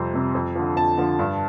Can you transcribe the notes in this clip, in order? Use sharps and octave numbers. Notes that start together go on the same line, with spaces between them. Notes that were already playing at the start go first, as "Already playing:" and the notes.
Already playing: F2 C3 G3 C5
C3 G3
F2
D3 F3
F2 A5
D3 F3
G2